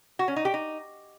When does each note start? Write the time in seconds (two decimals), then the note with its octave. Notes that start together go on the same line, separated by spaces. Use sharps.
0.19 F#4
0.28 C#4
0.36 D#4
0.45 G4
0.54 D#4